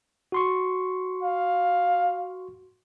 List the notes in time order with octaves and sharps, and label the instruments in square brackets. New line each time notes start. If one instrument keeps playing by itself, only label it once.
[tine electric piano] F#4 C6 C#6
[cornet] F5